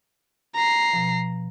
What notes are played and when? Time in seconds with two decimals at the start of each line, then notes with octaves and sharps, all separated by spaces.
0.55 A#5 C7
0.93 B2 F3